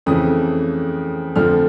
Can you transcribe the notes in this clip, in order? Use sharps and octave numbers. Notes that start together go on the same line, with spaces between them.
F2 C#3 E3 A3 D#6
F2 D3 F3 A3 F6